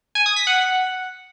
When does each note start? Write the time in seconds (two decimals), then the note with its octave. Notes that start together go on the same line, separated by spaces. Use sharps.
0.15 G#5
0.26 D#6
0.36 B6
0.47 F#5